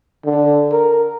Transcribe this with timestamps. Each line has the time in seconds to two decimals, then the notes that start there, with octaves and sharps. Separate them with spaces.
0.25 D3
0.72 A#4